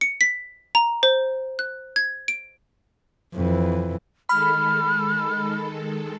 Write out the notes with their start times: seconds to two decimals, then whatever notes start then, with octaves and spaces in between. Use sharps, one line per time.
0.01 C#7
0.21 B6
0.75 A#5
1.03 C5
1.59 F#6
1.96 G#6
2.28 D7
3.34 F2 E3
4.29 D#3 G#3 A4 B5 F6